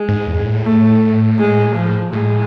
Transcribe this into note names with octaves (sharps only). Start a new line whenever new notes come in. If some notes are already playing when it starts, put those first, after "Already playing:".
Already playing: G#3
G#2
E2
G#2
A2
A3
G#3
F3
A2 G#3